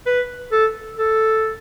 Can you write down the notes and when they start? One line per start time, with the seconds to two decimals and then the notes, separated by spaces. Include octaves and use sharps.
0.06 B4
0.52 A4
0.98 A4